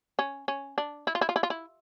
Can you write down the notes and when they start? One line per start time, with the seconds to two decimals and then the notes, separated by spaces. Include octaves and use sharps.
0.19 C#4
0.48 C#4
0.78 D4
1.07 E4
1.15 F4
1.21 E4
1.29 F4
1.36 E4
1.43 F4
1.50 E4